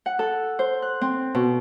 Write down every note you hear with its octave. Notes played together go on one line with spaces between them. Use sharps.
F#5
A4
C5
F#6
C4
B2